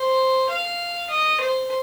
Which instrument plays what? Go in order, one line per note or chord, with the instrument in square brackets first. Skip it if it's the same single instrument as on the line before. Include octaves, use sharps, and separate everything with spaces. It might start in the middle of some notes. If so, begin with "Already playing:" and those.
Already playing: [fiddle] C5
F5
D#5
C5